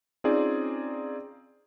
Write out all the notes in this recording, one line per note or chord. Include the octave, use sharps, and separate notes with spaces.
C4 C#4 D#4 F4 G#4 D5